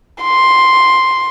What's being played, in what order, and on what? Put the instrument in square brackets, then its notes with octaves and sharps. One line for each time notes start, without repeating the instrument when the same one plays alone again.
[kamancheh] C6